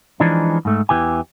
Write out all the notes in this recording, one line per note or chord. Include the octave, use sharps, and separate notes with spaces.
E3 F3 G#3 D4 D#4
G#2 A3
E2 E3 G4 G#5